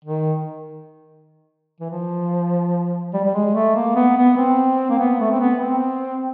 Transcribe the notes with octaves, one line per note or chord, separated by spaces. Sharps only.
D#3
E3
F3
G3
G3
G#3
A3
A#3
B3
B3
C4
A#3
B3
A3
C4
B3
C4